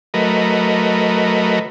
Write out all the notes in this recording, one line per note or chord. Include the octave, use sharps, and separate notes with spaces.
F#3 A3 A#4 B4 D#5